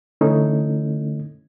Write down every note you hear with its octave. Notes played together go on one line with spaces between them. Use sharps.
D3 E3 A3 C#4 D#4 E4